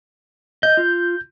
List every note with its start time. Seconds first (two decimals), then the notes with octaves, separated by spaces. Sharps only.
0.63 D#5 G6
0.77 F4